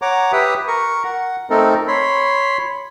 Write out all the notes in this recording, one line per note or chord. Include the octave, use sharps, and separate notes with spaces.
C#5 F#5 A#5 D6
G4 B4 E5 D#6
A#4 C#6
F#5
A3 C4 D#4 A4 A#4
C#5 B5 C6